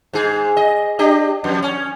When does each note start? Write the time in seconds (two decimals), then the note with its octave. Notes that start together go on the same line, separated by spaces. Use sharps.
0.13 G#2 G#4
0.57 D#5
0.99 D4 G4 D#5
1.44 F2
1.63 C#4